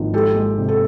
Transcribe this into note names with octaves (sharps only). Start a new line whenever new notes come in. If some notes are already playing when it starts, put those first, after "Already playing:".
Already playing: G#1 F3
G#3 G4 A4
G#3
C3
A4